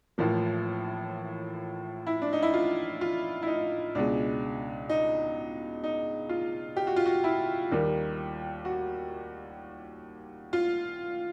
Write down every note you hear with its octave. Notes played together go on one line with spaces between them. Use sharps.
A1 A2 F3 A#3
E4
D4
D#4
E4
F4
F4
E4
D#4
C#2 B2 G#3 D4
D#4
D#4
F4
G4
F#4
F4
F#4
E4
D#2 D#3 G3 A#3
F#4
F4